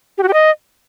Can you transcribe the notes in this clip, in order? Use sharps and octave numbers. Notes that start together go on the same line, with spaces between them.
G4
F#4
G4
D#5